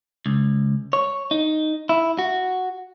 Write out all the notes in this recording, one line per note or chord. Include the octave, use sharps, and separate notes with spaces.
C#2
C#5
D#4
E4
F#4